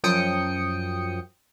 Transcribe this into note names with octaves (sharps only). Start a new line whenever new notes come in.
F#2 F3 G5 D#6 C#7